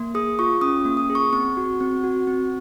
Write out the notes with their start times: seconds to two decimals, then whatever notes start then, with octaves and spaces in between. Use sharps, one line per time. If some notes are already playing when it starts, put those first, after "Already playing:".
Already playing: A#3
0.15 G#4 D#6
0.39 F4 C#6
0.61 C#4 D#6
0.85 A#3
0.97 D#6
1.10 G#4
1.15 C#6
1.33 C4 C#6
1.57 F#4
1.80 C4
2.04 F#4
2.27 C4